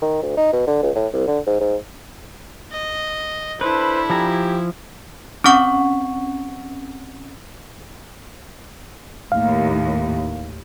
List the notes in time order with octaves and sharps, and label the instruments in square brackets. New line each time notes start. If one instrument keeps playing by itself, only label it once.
[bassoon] D#3
D2
D#4
B2
D3
C#2
A2
C2
D3
G#2
G#2
[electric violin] D#5
[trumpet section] D4 A4 B5 [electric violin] E4 [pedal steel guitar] B4 [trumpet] C5
[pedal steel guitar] F3 G#5 A#5 [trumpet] G4
[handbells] C4 C#4 F#5 C#6
[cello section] D#2 A2 [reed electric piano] F5